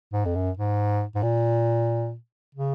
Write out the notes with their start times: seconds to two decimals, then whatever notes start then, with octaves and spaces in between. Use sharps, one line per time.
0.13 G#2
0.26 F2
0.35 F#2
0.57 G#2
1.15 G#2
1.23 A#2
2.55 C#3